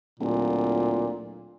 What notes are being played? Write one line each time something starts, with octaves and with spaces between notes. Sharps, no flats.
D1 A#2